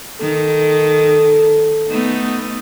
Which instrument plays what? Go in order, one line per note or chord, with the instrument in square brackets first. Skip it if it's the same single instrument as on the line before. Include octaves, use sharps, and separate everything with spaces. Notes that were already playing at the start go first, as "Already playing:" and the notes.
[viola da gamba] D#3 [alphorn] A4
[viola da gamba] A3 B3 D#4